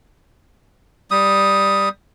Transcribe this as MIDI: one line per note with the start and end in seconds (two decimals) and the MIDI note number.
1.11 1.89 55
1.11 1.89 87